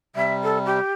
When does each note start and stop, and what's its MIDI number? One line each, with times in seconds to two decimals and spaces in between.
0.16 0.80 48
0.16 0.80 55
0.16 0.33 76
0.43 0.58 69
0.65 0.94 67